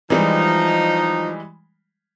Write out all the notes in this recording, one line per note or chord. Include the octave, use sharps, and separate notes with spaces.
E3 F3 G3 G#3 D#4